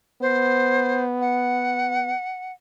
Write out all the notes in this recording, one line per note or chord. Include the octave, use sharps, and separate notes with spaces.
B3 C5
F#5